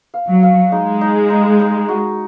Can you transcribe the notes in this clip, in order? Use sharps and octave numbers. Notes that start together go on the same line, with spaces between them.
F5
F#3
F5
G#3 D#4
D#4
D#4
D#4
F#4